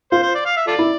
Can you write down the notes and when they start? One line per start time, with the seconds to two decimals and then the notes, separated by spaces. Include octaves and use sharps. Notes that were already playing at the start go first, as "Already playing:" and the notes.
0.12 F4 C5
0.22 C5
0.35 D5
0.45 F5
0.56 E5
0.67 F4 A4 D5
0.79 E4